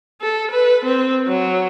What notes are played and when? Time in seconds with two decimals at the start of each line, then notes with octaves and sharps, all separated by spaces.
0.21 A4
0.51 B4
0.85 C4
1.27 F#3